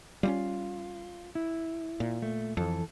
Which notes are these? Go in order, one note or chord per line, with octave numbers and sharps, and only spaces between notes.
G3 G#3 C#4 F4
E4
A#2
A3
F2 E3 A4